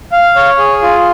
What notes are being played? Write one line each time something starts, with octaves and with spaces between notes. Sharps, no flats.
F5
C#5
G#4
F4